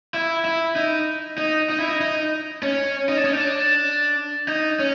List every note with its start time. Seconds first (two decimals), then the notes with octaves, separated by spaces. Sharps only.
0.14 E4
0.45 E4
0.76 D#4
1.38 D#4
1.70 D#4
1.79 E4
1.88 D#4
2.00 D#4
2.63 C#4
3.09 D#4
3.17 D4
3.24 C#4
3.33 D4
4.48 D#4
4.79 C#4